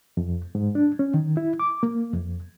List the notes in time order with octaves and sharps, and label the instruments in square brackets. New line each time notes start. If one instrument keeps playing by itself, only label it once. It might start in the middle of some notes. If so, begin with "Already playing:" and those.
[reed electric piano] F2
G#2
D4
C#4
D#3
E4
D6
A#3
F2